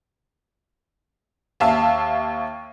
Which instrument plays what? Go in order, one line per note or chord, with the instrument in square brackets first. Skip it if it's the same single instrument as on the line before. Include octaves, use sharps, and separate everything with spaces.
[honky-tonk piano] D#2 E5 F5 A5